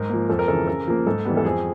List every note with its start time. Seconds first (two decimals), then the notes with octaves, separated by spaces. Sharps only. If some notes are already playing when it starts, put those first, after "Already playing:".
Already playing: G#2 A#4
0.10 F3 A#3
0.29 F2 A4
0.39 A#4
0.48 C#3 E3 A4
0.67 C#3 A#4
0.88 F3 A#3
1.07 G#2 A4
1.25 E3 G3 B3
1.37 A4
1.44 F2 G#4